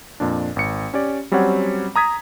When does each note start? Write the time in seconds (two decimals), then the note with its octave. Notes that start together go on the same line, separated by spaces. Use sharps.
0.20 F2 A#2 D4
0.56 G#1 C#7
0.94 C#4 G4 D5
1.31 F#3 G3 C4 C#4 C#5 F#5
1.96 A#5 D#6 G#6 B6